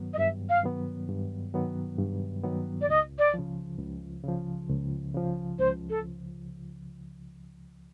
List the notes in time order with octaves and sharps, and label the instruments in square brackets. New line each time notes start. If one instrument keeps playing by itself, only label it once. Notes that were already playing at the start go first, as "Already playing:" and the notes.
Already playing: [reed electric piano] G2 D#3 F#3 B3
[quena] D#5
[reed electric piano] G2 [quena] E5
[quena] F5
[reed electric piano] D#3 F#3 B3
G2
D#3 F#3 B3
G2
D#3 F#3 B3
[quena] D5
[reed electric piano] C#2 [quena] D#5
[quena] D5
[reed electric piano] C#3 F3
C#2
C#3 F3
C#2
C#3 F3
[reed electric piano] C#2 [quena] C5
[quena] A4